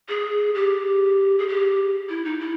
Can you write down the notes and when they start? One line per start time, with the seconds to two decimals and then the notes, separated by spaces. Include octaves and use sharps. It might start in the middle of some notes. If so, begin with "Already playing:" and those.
0.09 G#4
0.55 G4
1.38 G#4
1.48 G4
2.09 E4
2.25 D#4
2.40 E4